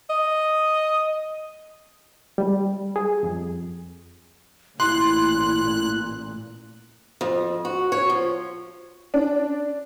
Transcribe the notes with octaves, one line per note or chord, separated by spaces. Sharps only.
D#5
G3
G#4
F2
A1 A#2 E4 C6 F#6
F2
F#4
C#5
F3
D4